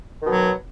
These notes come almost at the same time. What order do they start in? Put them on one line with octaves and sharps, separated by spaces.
D#3 B2 F#3